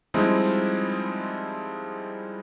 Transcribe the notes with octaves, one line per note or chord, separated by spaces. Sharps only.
F3 G3 G#3 C4 D#4 E4